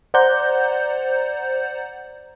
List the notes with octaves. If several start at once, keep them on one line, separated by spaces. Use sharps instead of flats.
C5 D5 F#5 A#5 G6